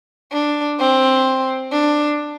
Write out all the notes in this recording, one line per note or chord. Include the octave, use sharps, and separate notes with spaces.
D4
C4
D4